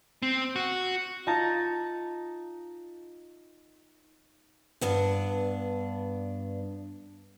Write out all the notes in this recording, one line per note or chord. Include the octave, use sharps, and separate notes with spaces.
C4
F#4
D#4 F4 D#5 A5 A#5
G2 B3 D4